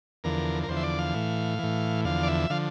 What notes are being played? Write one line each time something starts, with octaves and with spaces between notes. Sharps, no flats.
E2 D3 F3 A#4
A#4
E2 D3 F3 C5
E5
D5
F5
A2 E3
A2 E3
E2 D3 F3 F5
D5
E5
D3 F3 F5